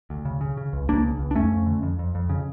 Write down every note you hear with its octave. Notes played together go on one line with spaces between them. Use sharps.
D2
C#3
C#3
C#3
C#2
C#2 A#3 D4
C#3
C#2
D4
F2 A3 C#4
F2
D3
F2
F2
F2
C#3